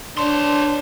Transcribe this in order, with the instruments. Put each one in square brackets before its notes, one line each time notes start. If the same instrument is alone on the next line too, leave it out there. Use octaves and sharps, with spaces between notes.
[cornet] D4 [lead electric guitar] C#5 C6